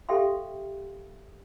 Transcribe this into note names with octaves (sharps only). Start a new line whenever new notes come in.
G4 A4 E5 F5 G5 C6